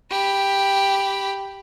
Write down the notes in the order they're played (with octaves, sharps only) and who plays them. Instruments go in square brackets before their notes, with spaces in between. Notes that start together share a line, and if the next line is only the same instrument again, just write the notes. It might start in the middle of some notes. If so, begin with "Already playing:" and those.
[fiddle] G4 B5